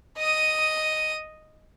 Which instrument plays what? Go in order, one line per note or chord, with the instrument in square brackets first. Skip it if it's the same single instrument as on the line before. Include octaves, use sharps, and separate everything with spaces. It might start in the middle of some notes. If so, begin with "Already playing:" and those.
[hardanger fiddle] D#5 D#6